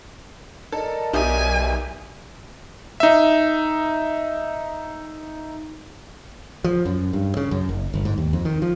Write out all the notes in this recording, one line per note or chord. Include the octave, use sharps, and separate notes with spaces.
A4 A#4 D5 D#5
B1 G4 E5 G#5 D#6
D#4 E5
F3
F#2
G2
C#3
F#2
F#1
G1
G#2
D#2
F2
D#3
F3